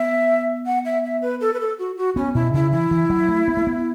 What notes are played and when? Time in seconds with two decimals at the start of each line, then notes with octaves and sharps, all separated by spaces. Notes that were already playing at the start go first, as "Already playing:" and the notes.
Already playing: B3 E5
0.66 F#5
0.85 E5
1.04 E5
1.22 B4
1.41 A4
1.54 B4
1.60 A4
1.79 F#4
1.97 F#4
2.16 B3 C#4
2.34 B2 E4
2.54 C#3 E4
2.72 E3 E4
2.91 E3
3.10 F#3
3.29 A3
3.48 B3
3.57 A3
3.67 B3